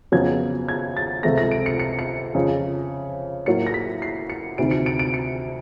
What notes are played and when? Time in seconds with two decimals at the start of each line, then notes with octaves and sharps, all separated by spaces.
0.12 F2 C#3 F#3 B3 G#6
0.68 G#6
0.97 A6
1.23 C#2 C3 F3 A3 A#6
1.38 A#6
1.51 D7
1.66 C#7
1.79 C#7
1.99 C#7
2.35 F2 C#3 F3
3.46 A2 F#3 A#3 C#7
3.67 A#6
3.74 B6
4.02 C7
4.30 C#7
4.58 D2 C3 D#3 D7
4.71 C#7
4.86 D7
4.99 D7
5.14 C#7